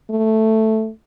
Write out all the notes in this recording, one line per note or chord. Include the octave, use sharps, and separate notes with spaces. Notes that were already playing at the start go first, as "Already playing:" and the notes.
A3